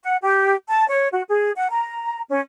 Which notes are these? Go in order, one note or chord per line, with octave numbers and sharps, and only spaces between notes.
F#5
G4
A5
C#5
F#4
G#4
F#5
A#5
C#4